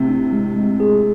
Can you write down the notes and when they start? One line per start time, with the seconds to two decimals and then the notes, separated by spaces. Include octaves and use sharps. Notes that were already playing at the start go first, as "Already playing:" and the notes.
Already playing: A2 C3 C4
0.09 D4
0.33 G#3
0.56 G#3
0.80 G#4